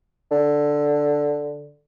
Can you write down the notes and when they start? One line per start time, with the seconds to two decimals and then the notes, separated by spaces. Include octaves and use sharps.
0.31 D3